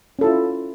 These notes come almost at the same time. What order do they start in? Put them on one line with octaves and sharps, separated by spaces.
C#4 A4 E4 F4